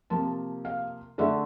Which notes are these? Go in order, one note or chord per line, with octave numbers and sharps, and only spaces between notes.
C3 F3 A#3 A5
F5
D3 A3 D4 E5